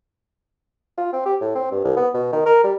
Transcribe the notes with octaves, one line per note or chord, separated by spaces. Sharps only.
F4
C4
G4
A2
C4
G2
C2
B3
B2
D#3
A#4
G3